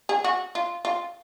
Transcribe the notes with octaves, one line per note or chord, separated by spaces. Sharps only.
G#4
F#4
F4
F4